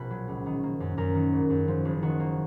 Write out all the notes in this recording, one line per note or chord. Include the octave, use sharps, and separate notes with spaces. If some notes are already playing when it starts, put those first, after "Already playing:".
Already playing: A#1 B2 B4
F#3
C#2
D#3
A#3
F#2
F#2 A#4
D#3
G#1
F#2
F3
F#1
D#3 F#4
A#3